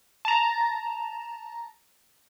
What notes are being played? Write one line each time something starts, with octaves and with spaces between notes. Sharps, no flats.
A5 A#5